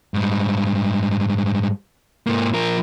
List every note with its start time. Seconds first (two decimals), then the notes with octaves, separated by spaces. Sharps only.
0.14 G#2 G3
2.27 G#2 A#3
2.54 F3 A#4